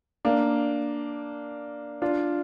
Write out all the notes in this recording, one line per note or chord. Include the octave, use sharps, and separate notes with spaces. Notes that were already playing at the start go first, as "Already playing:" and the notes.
A#3 D4
D4 F4